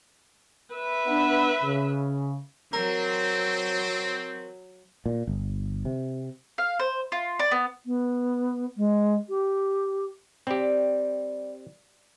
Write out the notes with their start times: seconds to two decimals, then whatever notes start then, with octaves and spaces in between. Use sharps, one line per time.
0.75 B4 E5
1.06 B3 D4
1.63 C#3
2.73 F#3 C4 A#4
5.06 A#2
5.27 G1
5.85 C3
6.58 F5
6.79 C5
7.12 F4
7.39 D5
7.51 B3
7.86 B3
8.77 G#3
9.29 G4
10.47 G3 C4 G4